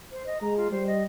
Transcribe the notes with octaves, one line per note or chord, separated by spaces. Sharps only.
C5
D#5
G#3 A#5
F4
G3 C5
D#5